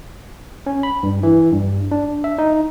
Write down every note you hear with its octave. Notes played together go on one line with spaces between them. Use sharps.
C#4
B5
G2
E3
G2
D4
E5
D#4